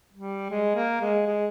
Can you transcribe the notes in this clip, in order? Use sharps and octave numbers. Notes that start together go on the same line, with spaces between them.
G3
G#3
A#3
G#3
G#3